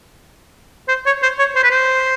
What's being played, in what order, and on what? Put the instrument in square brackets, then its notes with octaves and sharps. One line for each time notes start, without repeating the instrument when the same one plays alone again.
[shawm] C5
C#5
C5
C#5
C5
B4
C5